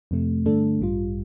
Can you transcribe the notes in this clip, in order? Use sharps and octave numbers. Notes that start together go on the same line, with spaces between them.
F2 C3 A3
G2 D3 A3 D4 A4
A1 G2 G3 F4